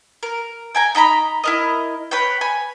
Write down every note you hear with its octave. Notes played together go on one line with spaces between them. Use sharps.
A#4
G5 G#5 A#5
D#4 D#5 A#5 B5
E4 A#4 D#5
B4 C#5 G5
G#5 B5